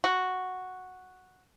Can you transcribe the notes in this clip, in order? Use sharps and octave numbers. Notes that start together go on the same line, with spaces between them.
F#4